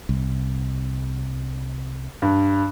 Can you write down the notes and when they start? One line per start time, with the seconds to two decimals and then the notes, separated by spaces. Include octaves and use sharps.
0.09 C2
2.22 G2